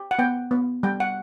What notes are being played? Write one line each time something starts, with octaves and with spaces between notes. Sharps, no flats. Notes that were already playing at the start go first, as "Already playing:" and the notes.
Already playing: G4
F#5
B3 G5
B3
G3 G5
F#5